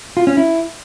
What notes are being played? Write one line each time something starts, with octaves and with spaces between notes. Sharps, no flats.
F4
C#4
E4